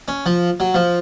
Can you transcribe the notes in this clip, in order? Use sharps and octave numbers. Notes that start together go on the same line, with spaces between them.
C#4
F3
F#3
F3